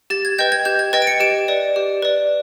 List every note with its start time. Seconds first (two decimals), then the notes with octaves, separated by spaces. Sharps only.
0.10 G4 A6
0.25 G#6
0.39 B4 D#5 G5 G6
0.52 G#6
0.65 G4 G6
0.79 G#6
0.93 B4 D#5 G5 A6
1.02 D7
1.07 C#7
1.20 G4 D7
1.48 B4 D5
1.76 G4
2.02 B4 D5